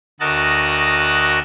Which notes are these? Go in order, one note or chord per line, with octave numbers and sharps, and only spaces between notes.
D2 F#4 A#4 D#5 A5 F#6